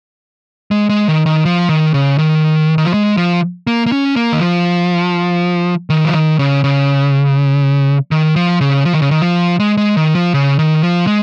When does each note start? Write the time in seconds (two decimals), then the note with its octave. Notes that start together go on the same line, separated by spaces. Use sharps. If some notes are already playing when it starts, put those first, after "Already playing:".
0.71 G#3
0.89 G#3
1.08 D#3
1.26 D#3
1.45 F3
1.69 D#3
1.94 C#3
2.18 D#3
2.78 D#3
2.85 F3
2.94 G#3
3.17 F3
3.67 A#3
3.86 A#3
3.92 C#4
4.16 A#3
4.33 D#3
4.41 F3
5.90 D#3
6.05 F3
6.13 D#3
6.39 C#3
6.64 C#3
8.11 D#3
8.36 F3
8.61 C#3
8.85 F3
8.93 D#3
9.02 C#3
9.11 D#3
9.22 F3
9.60 G#3
9.77 G#3
9.97 D#3
10.15 F3
10.34 C#3
10.59 D#3
10.83 F3
11.07 G#3